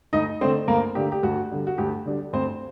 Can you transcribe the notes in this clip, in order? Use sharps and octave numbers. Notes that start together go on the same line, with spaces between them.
D2 D#4 D#5
D3 A3 C4 D4 C5
D2 A#3 A#4
D3 A3 D4 G4
G4
D2 F#4
D3 G3 D4
F#4
D2 G4
D3 G3 D4
D2 C4 C5